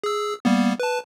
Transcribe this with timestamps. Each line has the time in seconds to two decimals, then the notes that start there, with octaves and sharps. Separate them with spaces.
0.04 G#4 E6
0.45 G3 A#3 B3
0.80 B4 A5